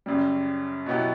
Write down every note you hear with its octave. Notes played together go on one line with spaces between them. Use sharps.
F#2 C#3 G3
B2 F#3 B3 E4 G4